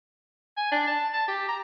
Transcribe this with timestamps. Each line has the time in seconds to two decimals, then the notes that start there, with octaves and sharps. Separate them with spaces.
0.57 G#5
0.72 D4
0.87 A5
1.13 A5
1.28 G4
1.48 A#5